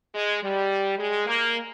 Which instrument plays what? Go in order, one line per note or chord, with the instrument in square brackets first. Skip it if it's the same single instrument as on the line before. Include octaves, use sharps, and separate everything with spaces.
[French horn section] G#3
G3
G#3
A#3